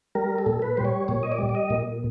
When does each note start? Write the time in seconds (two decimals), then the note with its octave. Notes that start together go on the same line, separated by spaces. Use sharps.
0.15 G3 A#4
0.38 A4
0.46 A#2
0.62 B4
0.77 G3 C5
0.85 C#5
1.08 A#2 C#5
1.23 D#5
1.32 D5
1.38 G3
1.49 D5
1.55 D#5
1.70 A#2